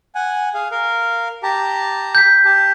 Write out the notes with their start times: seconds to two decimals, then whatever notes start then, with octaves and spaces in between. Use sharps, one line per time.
0.15 F#5 G#5
0.54 G#4 F5
0.71 A#4 F5
1.43 G4 A5 A#5
2.15 G6 B6
2.45 G4 A5